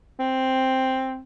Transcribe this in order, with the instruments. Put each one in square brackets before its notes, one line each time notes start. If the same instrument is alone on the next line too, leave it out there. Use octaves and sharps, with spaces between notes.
[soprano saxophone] C4